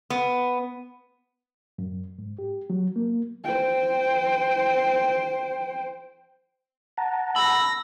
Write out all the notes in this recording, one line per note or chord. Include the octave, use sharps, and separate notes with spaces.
B3
F#2
G#2
G4
F#3
A#3
C5 G5
F#5 A5 A#5
B5 E6 A#6